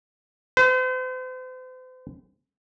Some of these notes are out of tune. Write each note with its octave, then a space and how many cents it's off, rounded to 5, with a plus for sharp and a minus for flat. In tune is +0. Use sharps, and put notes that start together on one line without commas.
C5 -40